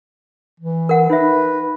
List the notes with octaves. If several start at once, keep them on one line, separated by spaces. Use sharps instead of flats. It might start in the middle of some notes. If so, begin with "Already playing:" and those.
E3
A#4 F#5
D#4 B4 E5